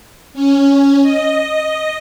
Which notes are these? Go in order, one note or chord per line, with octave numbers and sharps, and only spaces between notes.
C#4
D#5